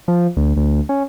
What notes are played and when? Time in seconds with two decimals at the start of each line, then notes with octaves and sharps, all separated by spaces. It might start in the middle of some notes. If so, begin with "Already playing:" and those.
0.08 F3
0.37 D2
0.57 D2
0.89 C#4